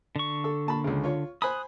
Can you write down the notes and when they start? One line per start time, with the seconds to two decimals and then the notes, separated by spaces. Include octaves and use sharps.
0.16 D3 C#6
0.44 A4
0.66 A#2 A5 B5
0.84 C#2 C#3
1.04 F4 C#5
1.42 C5 G#5 B5 D#6 F#6